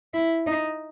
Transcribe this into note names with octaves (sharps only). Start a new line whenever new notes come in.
E4
D#4